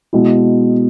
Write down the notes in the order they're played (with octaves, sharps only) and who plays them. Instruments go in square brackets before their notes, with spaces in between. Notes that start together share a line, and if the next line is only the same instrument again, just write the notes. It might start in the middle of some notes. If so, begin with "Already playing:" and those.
[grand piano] B2 G#3 E4